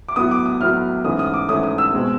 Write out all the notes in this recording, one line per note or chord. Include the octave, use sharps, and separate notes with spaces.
D6
A2 F#3 B3 D#6
D6
D#6
A2 F#3 B3 F6
G#2 E3 A3 C#4 D#6
D#6
D6
G#2 E3 A3 C#4 D#6
D#6
E6
B2 G#3 C4